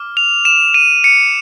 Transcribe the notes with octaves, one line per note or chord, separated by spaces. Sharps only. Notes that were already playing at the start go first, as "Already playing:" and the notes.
Already playing: D6 F6
F7
E7
D#7
C#7